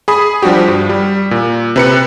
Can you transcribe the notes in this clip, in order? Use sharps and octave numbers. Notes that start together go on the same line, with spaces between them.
G#4 B5 D#6
F3 G3 D4 F#4 G4
G2
G3
A#2
C3 B4 C#7